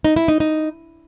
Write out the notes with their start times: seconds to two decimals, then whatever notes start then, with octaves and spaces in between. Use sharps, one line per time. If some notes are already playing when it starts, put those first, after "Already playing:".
0.05 D#4
0.16 E4
0.28 D#4
0.40 D#4